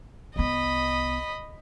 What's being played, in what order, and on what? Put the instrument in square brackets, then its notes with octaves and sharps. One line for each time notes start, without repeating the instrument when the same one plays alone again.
[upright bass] C2 B3 [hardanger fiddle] D#5 B5